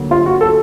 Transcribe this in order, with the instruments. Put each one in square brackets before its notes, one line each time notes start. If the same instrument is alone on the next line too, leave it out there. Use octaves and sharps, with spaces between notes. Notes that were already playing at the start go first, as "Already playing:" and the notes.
Already playing: [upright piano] D2 D3 F#3 A#3
[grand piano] F4
F#4
A4